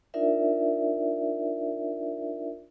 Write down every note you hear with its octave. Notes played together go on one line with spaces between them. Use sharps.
D4 D#4 F4 A#4 D5 E5